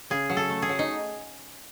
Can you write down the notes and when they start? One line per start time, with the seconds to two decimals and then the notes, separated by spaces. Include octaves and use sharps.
0.10 C#3 G#4
0.30 F#3
0.37 A4
0.50 A3
0.62 G#4
0.69 F#3
0.79 D#4